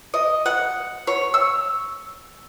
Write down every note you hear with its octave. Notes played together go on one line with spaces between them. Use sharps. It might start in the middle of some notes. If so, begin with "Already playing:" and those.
D#5
F#5
C#5
E6